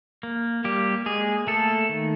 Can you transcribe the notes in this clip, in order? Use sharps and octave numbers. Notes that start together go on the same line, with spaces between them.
A#3
G3 A#3 G4
G#3 A#3 G#4
A3 A#3 A4
D#3